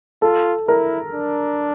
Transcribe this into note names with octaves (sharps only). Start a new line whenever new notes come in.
F4 A4
E4 A#4
D4